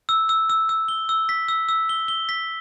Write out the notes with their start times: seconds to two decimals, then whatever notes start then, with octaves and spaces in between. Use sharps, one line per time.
0.09 E6
0.29 E6
0.49 E6
0.69 E6
0.88 G7
1.09 E6
1.29 B6
1.48 E6
1.69 E6
1.89 G7
2.08 G7
2.29 B6